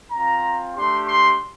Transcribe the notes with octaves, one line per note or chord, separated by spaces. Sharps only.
C4 F4 A#5
A3 D4 G4 C6
C6